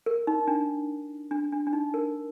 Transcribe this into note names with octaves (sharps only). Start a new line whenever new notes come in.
A#4
D#4
D4
D4
D4
D4
D#4
A#4